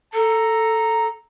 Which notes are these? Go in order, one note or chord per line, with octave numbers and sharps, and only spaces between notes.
A4 A#5